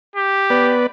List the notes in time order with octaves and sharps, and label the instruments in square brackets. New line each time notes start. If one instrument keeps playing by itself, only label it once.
[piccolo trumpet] G4
[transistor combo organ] B3 B4 D5